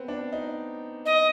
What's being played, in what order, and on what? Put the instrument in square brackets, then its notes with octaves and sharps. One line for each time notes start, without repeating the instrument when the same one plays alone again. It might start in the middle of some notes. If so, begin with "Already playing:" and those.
Already playing: [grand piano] B3 C4
D4
D#4
[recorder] D#5